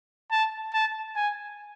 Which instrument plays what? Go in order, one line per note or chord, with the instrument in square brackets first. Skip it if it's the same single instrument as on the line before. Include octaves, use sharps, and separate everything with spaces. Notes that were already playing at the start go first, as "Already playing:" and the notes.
[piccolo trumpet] A5
A5
G#5